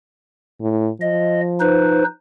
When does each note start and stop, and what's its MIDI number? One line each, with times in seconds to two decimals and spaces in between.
0.61 0.89 45
1.01 2.05 53
1.01 1.40 75
1.60 2.04 63
1.60 2.04 71
1.60 2.04 72